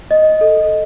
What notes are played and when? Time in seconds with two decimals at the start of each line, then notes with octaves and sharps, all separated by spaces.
0.11 D#5
0.41 A4